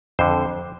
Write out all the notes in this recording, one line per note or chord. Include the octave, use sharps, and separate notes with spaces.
F2 D3 C5